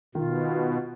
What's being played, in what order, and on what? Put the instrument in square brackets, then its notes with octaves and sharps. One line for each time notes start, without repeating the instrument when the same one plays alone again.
[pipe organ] B2 [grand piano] D#3 [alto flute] F4